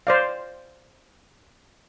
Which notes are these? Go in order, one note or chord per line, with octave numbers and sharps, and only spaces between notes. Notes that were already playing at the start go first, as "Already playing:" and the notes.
C5 D5 F5